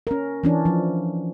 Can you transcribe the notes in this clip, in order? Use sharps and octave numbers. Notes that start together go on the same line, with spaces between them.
C#4 A#4
E3 C#4 D4
F3